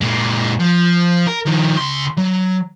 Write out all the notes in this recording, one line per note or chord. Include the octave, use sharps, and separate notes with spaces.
A#2 G#3
F3
A#4
D#3 F3
C#2 C6
F#3